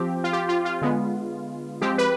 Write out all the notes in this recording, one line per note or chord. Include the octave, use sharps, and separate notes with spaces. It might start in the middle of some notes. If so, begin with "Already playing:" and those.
Already playing: F3 C4 G4
F4
G4
F4
F4
D3 G#3 B3
F3 G#3 C4 G4
B4